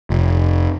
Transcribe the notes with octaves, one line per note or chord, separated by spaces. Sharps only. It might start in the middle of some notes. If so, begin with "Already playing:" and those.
F1